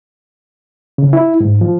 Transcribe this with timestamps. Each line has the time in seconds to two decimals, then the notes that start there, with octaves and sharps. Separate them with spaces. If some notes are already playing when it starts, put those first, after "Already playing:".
0.98 C#3
1.13 E4
1.40 G#2
1.61 F3